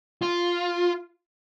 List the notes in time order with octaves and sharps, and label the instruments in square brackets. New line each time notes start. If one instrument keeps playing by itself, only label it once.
[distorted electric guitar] F4